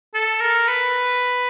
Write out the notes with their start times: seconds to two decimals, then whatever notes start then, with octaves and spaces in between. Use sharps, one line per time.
0.15 A4
0.41 A#4
0.68 B4